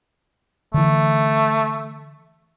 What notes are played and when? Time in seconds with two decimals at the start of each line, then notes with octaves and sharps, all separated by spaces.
0.74 D3 E3 A3